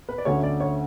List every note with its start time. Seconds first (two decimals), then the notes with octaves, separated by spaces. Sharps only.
0.09 B4
0.18 D5
0.25 D2 D3 A3 C#4 C#5
0.43 D5
0.60 C#5